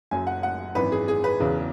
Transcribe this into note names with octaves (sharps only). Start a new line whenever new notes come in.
F#1 F#2 F#3 G#5
F#5
F#5
G#1 F#2 E3 B4
G#4
G#4
B4
E1 E2 C#3 E3